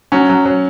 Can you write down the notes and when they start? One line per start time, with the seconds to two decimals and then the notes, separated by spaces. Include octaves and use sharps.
0.12 F#3 C#4
0.29 F#3
0.45 F#3